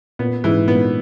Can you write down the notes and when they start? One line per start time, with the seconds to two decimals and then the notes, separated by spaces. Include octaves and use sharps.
0.19 A#2 B3
0.44 G#2 E3
0.67 A#2 B3
0.76 G#2
0.84 A#2